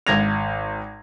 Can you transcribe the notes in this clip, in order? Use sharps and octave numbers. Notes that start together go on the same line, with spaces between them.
G#1 G#6 A#6 F7